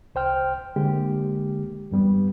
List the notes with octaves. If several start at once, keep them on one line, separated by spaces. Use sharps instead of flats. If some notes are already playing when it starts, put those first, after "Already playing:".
C2 C5 G5 F6
D3 G#3 A#3 G4
E2 G2 G3 B3